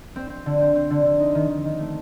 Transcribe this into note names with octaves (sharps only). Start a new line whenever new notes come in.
C4
C4
D3
C4
C4
D3
D3
D#4
D#3
D#3
D#3
A3